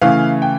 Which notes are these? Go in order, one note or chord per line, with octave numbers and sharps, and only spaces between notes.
C#3 E3 A3 F5
G5